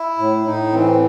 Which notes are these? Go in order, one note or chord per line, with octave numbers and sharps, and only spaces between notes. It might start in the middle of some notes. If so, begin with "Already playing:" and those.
Already playing: E4
A2
A2 D#4
E3 C4